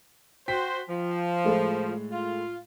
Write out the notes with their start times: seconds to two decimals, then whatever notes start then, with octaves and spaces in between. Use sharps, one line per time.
0.48 F#4 C5 G5 B6
0.90 F3
1.44 A2 G#3 A3
2.12 F4